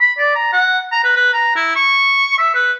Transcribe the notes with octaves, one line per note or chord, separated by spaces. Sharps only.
B5
D5
A#5
F#5
A#5
B4
B4
A#5
E4
C#6
E5
B4